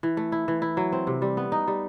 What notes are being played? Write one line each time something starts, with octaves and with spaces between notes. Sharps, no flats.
E3
A3
E4
E3
E4
F#3
C4
C3
G3
B3
D#4
G3